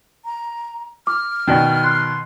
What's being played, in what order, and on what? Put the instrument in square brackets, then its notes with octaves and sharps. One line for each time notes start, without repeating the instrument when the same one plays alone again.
[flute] A#5
[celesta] D6 [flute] F6
[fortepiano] B2 D#3 [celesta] D5 G5
[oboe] C6 [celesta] F#6